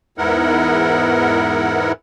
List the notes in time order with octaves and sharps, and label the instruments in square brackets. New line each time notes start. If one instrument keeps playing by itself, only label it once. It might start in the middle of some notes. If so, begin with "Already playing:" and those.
[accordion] E2 G#2 B3 E4 A#4 F#5